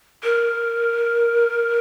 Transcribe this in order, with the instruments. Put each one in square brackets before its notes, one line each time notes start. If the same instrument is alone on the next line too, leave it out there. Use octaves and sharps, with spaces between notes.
[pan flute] A#4